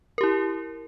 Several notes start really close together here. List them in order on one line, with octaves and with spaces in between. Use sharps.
A#4 G4 E4